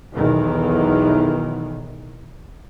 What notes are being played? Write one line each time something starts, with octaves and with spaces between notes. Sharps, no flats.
B1 E2 D#3 E3